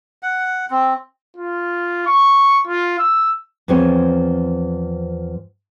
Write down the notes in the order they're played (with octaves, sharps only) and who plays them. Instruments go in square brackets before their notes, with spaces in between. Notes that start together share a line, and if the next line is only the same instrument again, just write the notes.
[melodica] F#5
C4
[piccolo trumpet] F4
C#6
F4
E6
[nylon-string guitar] E2 F3 C4 G#4 C#5